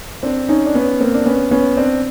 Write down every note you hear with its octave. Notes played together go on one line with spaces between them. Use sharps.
C4 D4
C#4 D#4
D4
B3 C#4
A#3 C4
D4
B3 C#4
B3 C#4
C4 D4